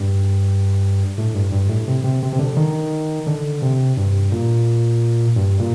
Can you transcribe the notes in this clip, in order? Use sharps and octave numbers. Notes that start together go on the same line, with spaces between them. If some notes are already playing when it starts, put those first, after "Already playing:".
Already playing: G2
A2
G2
G2
A2
C3
C3
C3
C3
D3
D#3
D3
C3
G2
A#2
G2
A#2